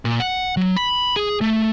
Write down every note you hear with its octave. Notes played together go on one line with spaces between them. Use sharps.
A#2
F#5
F#3
B5
G#4
A3